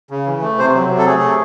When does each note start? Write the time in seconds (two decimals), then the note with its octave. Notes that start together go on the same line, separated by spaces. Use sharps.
0.10 C#3
0.26 E3
0.42 A3
0.58 C3 C5
0.74 F#3
0.90 C3
0.98 A4
1.06 A3 G#4
1.21 C3